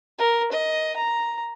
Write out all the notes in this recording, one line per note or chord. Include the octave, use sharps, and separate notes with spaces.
A#4
D#5
A#5